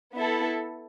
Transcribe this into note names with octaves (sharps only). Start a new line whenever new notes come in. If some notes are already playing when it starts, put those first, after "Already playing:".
B3 E4 A4